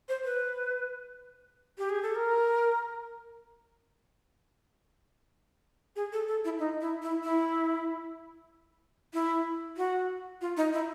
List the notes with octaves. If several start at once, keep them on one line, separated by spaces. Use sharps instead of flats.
C5
B4
G4
G#4
A4
A#4
G#4
A4
A4
E4
D#4
E4
E4
E4
E4
F#4
F4
D#4
E4